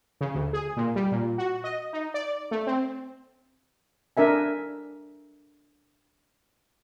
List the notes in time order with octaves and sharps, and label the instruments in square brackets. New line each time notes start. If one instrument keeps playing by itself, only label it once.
[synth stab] C#3
D2
G#4
A#2
G3
A#2
F#4
D#5
D#4
D5
A3
C4
[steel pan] D4 A#4 E5 G#5